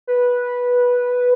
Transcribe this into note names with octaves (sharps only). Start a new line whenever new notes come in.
B4